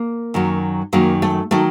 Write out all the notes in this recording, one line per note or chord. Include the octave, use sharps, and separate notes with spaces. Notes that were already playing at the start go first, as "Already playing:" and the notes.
Already playing: A#3
F#2 D#3 F#3
F#2 D#3 F#3 A#3
A3
D#3 F#3 A3